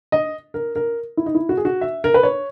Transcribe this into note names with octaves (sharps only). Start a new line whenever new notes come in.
D#5
A#4
A#4
E4
D#4
E4
F#4
G#4
F#4
E5
A#4
B4
C#5